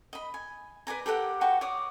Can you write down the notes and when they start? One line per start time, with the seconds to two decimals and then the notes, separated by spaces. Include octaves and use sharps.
0.13 D#5 B5
0.34 G#5
0.87 B4 D5 G#5 A#5
1.06 G4 A4 A#4 F#5
1.41 F#4 B4 G5 C#6
1.61 C#5 D5 D6 D#6